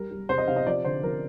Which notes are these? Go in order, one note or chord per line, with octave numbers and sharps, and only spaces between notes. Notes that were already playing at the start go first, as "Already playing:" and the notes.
Already playing: G3 A#4
G3
C3 C5
D#5
C3 F5
D#5
F3 D5
D3 C5
F3 A#4